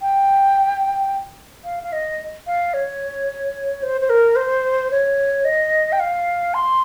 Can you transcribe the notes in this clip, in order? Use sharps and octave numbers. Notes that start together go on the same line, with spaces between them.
G5
F5
F5
D#5
F5
C#5
C5
C5
A#4
C5
C#5
D#5
G5
F5
C6